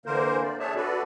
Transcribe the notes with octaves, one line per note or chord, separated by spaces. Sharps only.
D3 E3 A#3 A#4 C5
D5
D4 G#4 C#5 E5 A5
F#4 A4 B4 D5